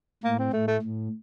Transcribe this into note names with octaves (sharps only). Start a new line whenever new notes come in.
A2 A#3
C4
A2 A3
A3
A2